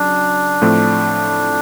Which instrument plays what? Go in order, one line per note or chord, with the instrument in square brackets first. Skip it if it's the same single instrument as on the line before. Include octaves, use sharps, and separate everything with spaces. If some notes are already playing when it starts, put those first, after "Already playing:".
Already playing: [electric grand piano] C#3 F#3 [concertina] D4
[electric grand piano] A2 F3 A3 C4